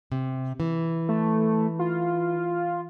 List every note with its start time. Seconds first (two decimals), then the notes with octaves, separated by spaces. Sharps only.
0.12 C3
0.60 E3
1.09 A3
1.79 F4